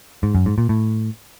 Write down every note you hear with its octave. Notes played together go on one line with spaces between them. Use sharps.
G#2
F#2
G#2
A#2
A2